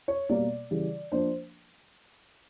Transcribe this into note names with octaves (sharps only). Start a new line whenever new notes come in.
C#5
B2 G3 A#3 D5
C#3 E3 G3
F3 A#3 D4 C5